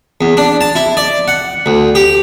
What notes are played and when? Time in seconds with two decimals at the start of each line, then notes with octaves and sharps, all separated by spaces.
0.21 E2
0.37 D4
0.61 A5
0.75 E4
0.97 D5
1.28 F#5
1.66 D2
1.95 G4